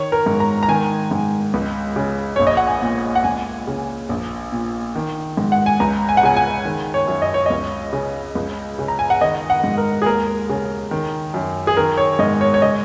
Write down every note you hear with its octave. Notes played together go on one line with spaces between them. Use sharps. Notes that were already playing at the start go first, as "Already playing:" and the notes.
Already playing: D#3 C#5
A#4
G#2
A#5
A#5
D#3 G#5
G#2
C#2
C#3
A#1 C#5
D#5
F#5
G#5
A#2
F#5
C#2 G#5
C#3
A#1
A#2
D#3
G#2
F#5
G#5
C#2 A#5
G#5
F#5
C#3 G#5
G#5
D#3
C#5
F#2
D#5
C#5
C#2 D#5
C#3
C#2
C#3
A#5
G#5
F#5
D#3 D#5
F#5
G#2
A#4
G#4
D#2 A#4
C#3
D#3
F#2
G#4
D#3 A#4
C#5
G#2 D#5
C#5
C#5
C#3 D#5